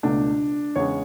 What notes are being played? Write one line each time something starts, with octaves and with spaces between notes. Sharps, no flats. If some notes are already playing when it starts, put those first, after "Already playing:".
C#2 B2 A3 D4
E2 C#3 G#3 C#5